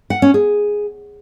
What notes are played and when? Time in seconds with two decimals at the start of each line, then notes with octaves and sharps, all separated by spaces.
0.10 F#5
0.22 C#4
0.34 G#4